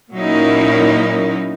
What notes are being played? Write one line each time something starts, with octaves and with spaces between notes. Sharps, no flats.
A#2 F#3 C#4 D#4 E4 A#4